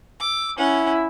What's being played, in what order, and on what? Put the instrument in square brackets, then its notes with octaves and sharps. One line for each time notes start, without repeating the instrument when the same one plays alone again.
[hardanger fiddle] D6 [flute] E6
[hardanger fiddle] C#4 F#5 [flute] E4